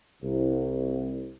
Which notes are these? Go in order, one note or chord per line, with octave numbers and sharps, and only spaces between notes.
C2